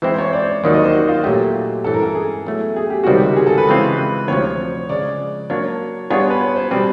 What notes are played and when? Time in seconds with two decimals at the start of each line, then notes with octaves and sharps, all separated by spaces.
0.02 E3 G#3 C4 E4 C5
0.14 C5
0.18 C#5
0.33 D5
0.43 C5
0.64 D#2 D#3 F#3 D5
0.74 D#5
0.84 C5
0.93 F#4
1.08 F4
1.24 A#2 F#3 A3 G4
1.84 G2 E3 G#3 C4 A4
1.94 A#4
2.03 A4
2.15 G#4
2.46 B2 F#3 A3
2.76 G#4
2.90 G4
3.04 C#2 C3 D#3 G3 C4 F#4
3.18 G4
3.29 G4
3.36 G#4
3.47 A4
3.58 B4
3.67 C#3 E3 G#3 C4 F4
3.98 B4
4.28 D2 C3 F3 C#5
4.89 C#3 F3 G#3 D5
5.50 F#3 A#3 D4 C#5
6.10 G3 B3 D4 F4 G#4 C#5
6.30 B4
6.41 C#5
6.56 C5
6.71 B2 G3 C4 B4